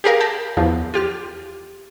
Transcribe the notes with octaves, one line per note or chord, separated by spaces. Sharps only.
G4 G#4 A#4 F5
A5 B5 G6
E2 F3
F4 G4 F6